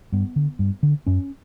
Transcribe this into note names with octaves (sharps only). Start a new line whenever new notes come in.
G2 B3
D3
G2
D3
F#2 C#4